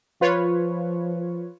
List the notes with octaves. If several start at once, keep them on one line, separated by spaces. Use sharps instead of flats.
F3 F4 B4 C#5